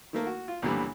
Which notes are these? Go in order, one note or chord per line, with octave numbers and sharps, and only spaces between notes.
D#3 A3 A#3
F#4
F4
C#2 A#2 D3 E3 G3 B3